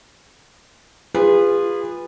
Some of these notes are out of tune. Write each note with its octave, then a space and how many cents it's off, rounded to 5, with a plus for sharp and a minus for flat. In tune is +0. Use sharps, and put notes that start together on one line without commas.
F4 +0 G#4 -30 B4 +0